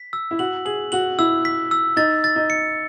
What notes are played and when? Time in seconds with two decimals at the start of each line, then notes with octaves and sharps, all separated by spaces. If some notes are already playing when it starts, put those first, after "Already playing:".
Already playing: B6
0.13 E6
0.31 E4
0.39 F#4 F#7
0.65 G#4 F#7
0.92 F#4 F#7
1.19 E4 E6
1.45 B6
1.71 E6
1.96 D#4 A6
2.24 A6
2.36 D#4
2.50 C#7